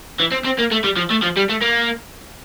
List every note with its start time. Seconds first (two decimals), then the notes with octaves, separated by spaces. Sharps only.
0.20 E3
0.32 C4
0.45 C4
0.59 A#3
0.72 A3
0.84 G3
0.97 F3
1.10 A3
1.22 F3
1.36 G3
1.49 A3
1.61 A#3